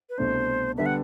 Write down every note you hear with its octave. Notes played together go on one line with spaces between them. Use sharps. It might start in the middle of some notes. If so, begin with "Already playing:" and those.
B4
C2 B2 A3 D4 C5
D3 G3 B3 D4 E5
F#5